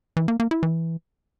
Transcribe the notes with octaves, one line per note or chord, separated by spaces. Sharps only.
E3
A#3
A#3
E4
E3